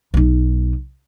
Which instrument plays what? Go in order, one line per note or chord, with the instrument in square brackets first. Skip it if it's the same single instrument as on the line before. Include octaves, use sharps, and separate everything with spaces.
[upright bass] B1 D#4